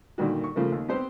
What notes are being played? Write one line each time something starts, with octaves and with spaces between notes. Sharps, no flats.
A#2 D3 D#3 G3 A#3 F#4
C#6
C#3 F3 A3 A#3
D#2
B3 C4 G4 C5